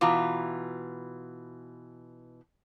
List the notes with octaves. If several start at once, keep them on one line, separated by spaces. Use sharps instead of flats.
B2 E3 F4 A#5 D6